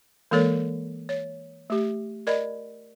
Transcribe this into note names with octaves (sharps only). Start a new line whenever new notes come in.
E3 G#3 A#3 A4 A#4 C#5
C#5
A3 G4
A#4 D5 D#5 B5